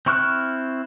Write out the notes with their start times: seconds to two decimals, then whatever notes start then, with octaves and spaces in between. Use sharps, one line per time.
0.06 C4 E4 C#6 F6 F#6